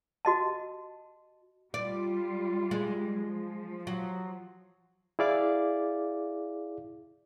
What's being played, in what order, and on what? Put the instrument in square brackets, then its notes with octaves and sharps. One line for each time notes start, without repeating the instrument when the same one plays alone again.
[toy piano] F#4 D#5 A5
[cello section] G3 F4 [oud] D5
[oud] G#3
[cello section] F3
[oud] F#3
[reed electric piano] E4 G#4 D5 F5 D6